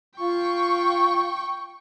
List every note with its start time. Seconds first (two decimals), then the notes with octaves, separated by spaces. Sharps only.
0.20 F4 G5 C#6